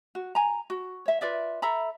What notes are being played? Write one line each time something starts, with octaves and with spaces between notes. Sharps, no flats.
F#4
G#5 A#5
F#4
C#5 E5
F4 B4 D5 E5
A4 E5 A#5 B5